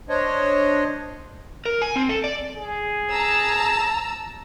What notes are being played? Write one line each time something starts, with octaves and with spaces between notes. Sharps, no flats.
D4 C5 C#5 D#5
A#4
G#5
C4
A4
D5
G#4
A5 A#5 E6